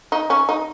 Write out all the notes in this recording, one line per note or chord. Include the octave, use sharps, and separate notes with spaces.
D#4
C#4
D#4